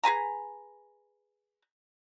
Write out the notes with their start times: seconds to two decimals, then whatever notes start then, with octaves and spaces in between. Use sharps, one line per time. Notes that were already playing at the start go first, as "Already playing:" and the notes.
0.04 G#4 B4 G#5 A#5